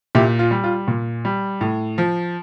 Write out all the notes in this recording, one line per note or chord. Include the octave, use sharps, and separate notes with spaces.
A#2 E4 G4
F4
G3
F4
A#2
G3
A2
F3